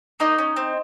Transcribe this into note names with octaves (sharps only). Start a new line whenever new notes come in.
A#3 D#4 D#5
C#4
C4